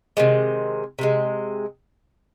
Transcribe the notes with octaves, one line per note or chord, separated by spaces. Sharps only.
C3 D#3 G#3
C3 D#3 G#3